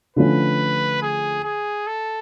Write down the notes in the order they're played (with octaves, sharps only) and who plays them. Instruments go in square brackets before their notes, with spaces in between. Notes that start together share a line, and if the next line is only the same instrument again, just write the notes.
[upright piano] D3 F3 A3 C#4 [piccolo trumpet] B4
[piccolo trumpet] G#4
G#4
A4